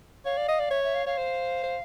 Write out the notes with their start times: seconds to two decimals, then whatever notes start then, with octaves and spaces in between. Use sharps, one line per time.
0.25 C#5 F5
0.37 D5
0.48 D#5
0.60 D5
0.71 C#5 E5
0.83 E5
0.94 F5
1.06 C#5 F5
1.18 C5
1.63 C5